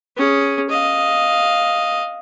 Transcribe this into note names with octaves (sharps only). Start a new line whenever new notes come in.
C#4 G#4
D#5 F5